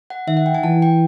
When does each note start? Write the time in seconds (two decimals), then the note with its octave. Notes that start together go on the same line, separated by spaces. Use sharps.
0.10 F#5
0.28 D#3 E5
0.37 F#5
0.46 G5
0.54 G#5
0.63 E3 A5
0.82 G5